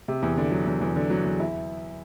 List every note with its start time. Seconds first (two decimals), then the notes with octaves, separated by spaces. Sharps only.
0.08 C3
0.22 E2
0.37 D3
0.51 F#3
0.67 E2
0.81 E2
0.96 D3
1.10 F#3
1.25 E2
1.40 E4